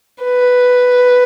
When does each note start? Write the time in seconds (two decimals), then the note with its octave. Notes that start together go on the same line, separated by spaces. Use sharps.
0.23 B4